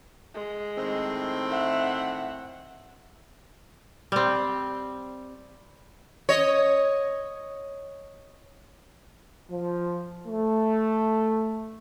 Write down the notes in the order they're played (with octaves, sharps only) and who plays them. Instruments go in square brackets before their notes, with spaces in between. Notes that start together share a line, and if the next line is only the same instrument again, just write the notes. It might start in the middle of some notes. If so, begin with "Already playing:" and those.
[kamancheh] G#3
[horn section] A2 D#3 C4
[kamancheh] E5 F#5
[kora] G3 C4
[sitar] C#5 D#5
[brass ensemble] F3
A3